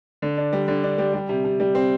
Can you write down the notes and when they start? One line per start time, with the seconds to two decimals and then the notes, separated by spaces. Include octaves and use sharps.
0.22 D3
0.38 D4
0.53 G3
0.68 D3
0.83 D4
0.98 G3
1.14 G3
1.29 C3
1.44 C3
1.60 G3
1.75 C4